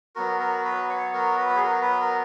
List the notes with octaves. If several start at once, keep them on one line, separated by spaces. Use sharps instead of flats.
F#3 B3 F#4 A#4
A#4
B4
C#5
A#4
B4
F#4
G#4
A#4
B4
A#4